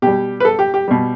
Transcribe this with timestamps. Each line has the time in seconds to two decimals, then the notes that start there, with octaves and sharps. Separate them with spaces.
0.02 B2 G3 G4
0.40 B4
0.45 A4
0.59 G4
0.74 G4
0.88 B2 G3